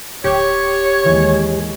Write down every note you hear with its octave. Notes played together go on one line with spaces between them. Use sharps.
D1 G4 C#5
D#2 E3 G#3